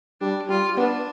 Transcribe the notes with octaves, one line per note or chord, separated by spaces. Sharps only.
G3 D4
G3 F4
B3 D4